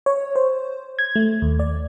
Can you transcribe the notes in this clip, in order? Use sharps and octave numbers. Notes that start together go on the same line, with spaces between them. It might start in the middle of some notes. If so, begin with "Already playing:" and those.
C#5
C5
G#6
A3
D#2
D5